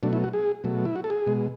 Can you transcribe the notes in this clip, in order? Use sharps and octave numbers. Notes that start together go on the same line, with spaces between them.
B2 F#3 A3 D4
E4
F#4
G#4
B2 F#3 A3
E4
F#4
A4
G#4
B2 G#3